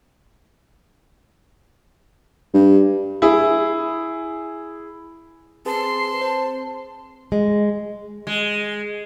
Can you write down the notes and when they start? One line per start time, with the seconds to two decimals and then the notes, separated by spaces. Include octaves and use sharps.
2.54 G2
3.22 E4 G#4
5.66 C4 G#4 B4 A5 C6
6.21 C5
7.32 G#3
8.27 G#3